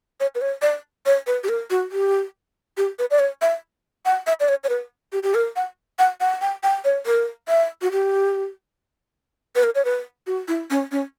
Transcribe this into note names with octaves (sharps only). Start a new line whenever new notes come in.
C#5
B4
C#5
D5
C#5
B4
G4
A#4
F#4
G4
G4
B4
D5
C#5
E5
F#5
E5
D5
C#5
C#5
B4
G4
G4
A#4
F#5
F#5
F#5
G5
G5
C#5
A#4
E5
F#4
G4
B4
A#4
C#5
B4
F#4
E4
C#4
C#4